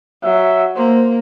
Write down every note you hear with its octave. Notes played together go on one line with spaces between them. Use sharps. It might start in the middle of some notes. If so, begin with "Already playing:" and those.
F#3 E5
A#3 C5